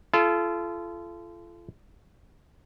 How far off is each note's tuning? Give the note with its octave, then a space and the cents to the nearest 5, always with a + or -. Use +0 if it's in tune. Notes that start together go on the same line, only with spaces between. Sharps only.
F4 -35 A4 -30